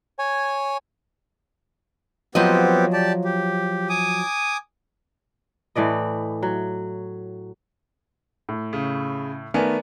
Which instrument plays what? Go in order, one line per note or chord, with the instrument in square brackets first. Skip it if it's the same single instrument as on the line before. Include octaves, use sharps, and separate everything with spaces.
[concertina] C#5 G#5
[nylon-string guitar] F3 F#3 D#5 [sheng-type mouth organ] B3 C4 G4
[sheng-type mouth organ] G4 D5 A5
G4
G#5 D6 D#6
[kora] A2 E3 D5 D#5
F#3
[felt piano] A2
[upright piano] C#3
[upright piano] D#3 A3 B3 [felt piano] A#4 D5 G#5